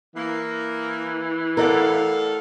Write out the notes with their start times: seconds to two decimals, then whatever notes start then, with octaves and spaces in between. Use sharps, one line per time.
0.15 E3 A#3
1.57 A2 A4 A#4 D5 F5 F#5